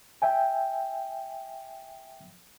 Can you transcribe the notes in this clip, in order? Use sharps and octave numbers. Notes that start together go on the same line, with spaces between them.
E5 G5 G#5